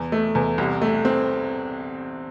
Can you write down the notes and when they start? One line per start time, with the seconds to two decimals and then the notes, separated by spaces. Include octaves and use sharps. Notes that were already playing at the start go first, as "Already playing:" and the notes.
Already playing: E2
0.12 A3
0.35 E2
0.58 C2
0.82 A3
1.05 C4